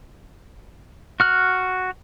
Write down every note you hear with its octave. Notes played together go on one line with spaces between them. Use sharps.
F#4 F6 F#6